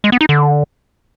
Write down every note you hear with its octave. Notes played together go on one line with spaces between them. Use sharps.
G#3
B3
D#4
D3